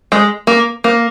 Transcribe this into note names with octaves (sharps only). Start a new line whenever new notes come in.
G#3
A#3
A#3